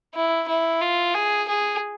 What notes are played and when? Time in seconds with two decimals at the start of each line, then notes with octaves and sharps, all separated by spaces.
0.15 E4
0.48 E4
0.81 F4
1.14 G#4
1.48 G#4